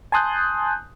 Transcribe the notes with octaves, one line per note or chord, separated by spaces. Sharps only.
G#5 A5 C6 D#6 F#6 G6